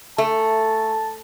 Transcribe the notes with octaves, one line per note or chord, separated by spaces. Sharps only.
A3 A5